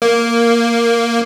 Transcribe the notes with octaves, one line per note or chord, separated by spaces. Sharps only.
A#3